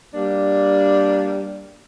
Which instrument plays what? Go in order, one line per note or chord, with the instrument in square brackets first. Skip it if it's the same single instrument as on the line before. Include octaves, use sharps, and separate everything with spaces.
[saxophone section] G3 A#3 D4